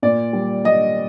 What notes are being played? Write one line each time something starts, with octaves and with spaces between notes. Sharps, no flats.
A#2 D5
G3
G3 D#5